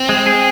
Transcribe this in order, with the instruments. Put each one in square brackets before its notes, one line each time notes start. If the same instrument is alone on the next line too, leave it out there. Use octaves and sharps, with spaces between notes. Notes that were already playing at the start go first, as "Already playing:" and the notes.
Already playing: [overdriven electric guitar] C4
[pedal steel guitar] G#3
G#4